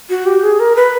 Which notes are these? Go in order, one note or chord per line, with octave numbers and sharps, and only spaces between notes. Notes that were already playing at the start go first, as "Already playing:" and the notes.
F#4
G4
G#4
A#4
B4